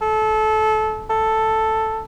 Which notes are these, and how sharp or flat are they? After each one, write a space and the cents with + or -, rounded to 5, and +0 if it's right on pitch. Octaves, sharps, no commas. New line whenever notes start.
A4 -25
A4 +5